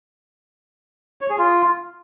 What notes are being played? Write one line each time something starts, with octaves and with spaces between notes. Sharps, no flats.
C#5
G#4
F4